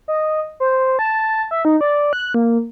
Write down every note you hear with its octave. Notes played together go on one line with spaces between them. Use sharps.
D#5
C5
A5
E5
D#4
D5
F#6
A#3